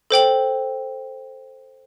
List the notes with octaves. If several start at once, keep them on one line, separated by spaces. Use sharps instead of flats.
A4 C5 G5 F#7